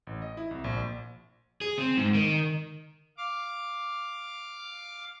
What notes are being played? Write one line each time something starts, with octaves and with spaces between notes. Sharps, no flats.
A1
D#5
E4
C2
A#1
G#4
C4
G#2
D#3
F5 D6